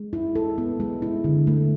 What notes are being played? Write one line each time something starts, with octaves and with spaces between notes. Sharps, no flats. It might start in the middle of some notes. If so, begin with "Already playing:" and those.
Already playing: G#3
E4
A4
B3
G#3
E4
D3
A3